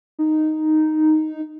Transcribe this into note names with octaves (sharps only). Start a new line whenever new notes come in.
D#4